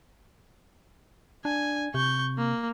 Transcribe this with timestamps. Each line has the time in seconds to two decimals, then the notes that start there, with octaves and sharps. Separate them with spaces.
1.45 D4 G#5
1.94 C3 C#6 G6
2.38 A#3